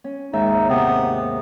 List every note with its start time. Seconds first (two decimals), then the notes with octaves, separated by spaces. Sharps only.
0.04 C#4
0.33 D#2 G#2 D#4 E5
0.69 C3 B3